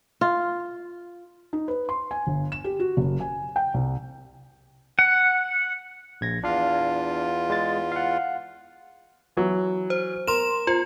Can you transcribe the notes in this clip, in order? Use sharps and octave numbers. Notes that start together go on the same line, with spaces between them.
F4
D#4
B4
C6
G#5
G1
E7
G4
F#4
F#1
G#5
G5
C2
F#5
A#1 G#6 A#6
E2 D4 F4 F5
G#3 A6
F5 F#5
E3 F#3
C5
A#4 C6 E7
F4 C5